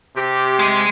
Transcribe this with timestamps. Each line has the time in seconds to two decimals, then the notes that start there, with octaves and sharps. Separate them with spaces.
0.16 C3 G4
0.59 G#3